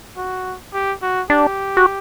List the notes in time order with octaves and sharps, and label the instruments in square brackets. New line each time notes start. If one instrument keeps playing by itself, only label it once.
[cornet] F#4
G4
F#4
[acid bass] D4 [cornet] G4
[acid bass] F#4